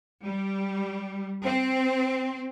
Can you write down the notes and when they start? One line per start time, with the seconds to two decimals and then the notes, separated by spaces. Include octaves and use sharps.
0.23 G3
1.44 C4